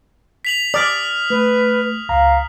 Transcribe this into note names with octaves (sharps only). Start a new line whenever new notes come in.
B6 F7 F#7
D5 D#6 F6 B6
A3 B4
C#2 F5 A#5